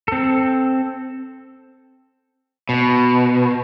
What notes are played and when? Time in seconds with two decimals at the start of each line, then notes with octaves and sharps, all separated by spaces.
0.08 C4 A4
2.69 B2